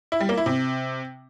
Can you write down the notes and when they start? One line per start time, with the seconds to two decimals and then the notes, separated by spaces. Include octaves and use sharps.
0.12 E4
0.20 G3
0.29 A#3
0.37 E4
0.46 C3